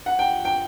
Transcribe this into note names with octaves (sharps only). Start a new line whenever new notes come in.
F#5
G5
G5